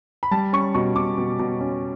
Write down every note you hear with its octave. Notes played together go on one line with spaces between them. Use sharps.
B5
G3 A5
C#4 C#6
B2 C#6
B2 D6
B2
B2
C#4